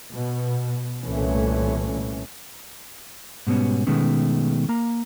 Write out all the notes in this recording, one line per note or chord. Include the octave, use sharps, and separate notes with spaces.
B2
C2 A#2 E3 A3 C#4
G#2 B2 G3 B3 C#4
B2 D#3 G#3 A3 B3 C#4
A#3 A#5